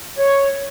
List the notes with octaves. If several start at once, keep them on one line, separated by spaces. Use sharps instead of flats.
C#5